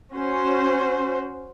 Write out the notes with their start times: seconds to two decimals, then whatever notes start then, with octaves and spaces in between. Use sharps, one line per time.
0.13 C#4 F#4 C5